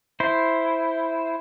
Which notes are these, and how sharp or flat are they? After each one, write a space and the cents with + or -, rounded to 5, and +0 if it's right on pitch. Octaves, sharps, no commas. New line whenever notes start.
E4 +0 C5 +0